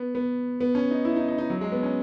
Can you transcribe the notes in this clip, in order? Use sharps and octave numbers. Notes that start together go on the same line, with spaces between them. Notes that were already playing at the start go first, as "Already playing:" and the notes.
Already playing: B3
B3
B3
C#4
D#4
E4
D#4
D#4
D#4
F#3
G#3
B3
C#4